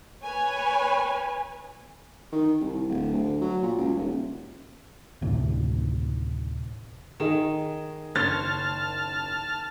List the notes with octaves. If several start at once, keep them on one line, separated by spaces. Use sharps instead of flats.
B4 C#5 G#5
D#3
C2
D1
D2
F#3
A#2
C#2
D#1
D2 A2 C3 D#3
D#3 G#4 D#5 E7
F#1 C5 C#5 A5 F6 A6